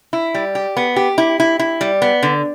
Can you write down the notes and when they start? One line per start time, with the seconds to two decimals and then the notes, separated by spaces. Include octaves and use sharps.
0.13 E4
0.35 G3
0.55 G4
0.77 B3
0.96 G4
1.18 E4
1.40 E4
1.59 E4
1.81 G3
2.02 B3
2.23 D3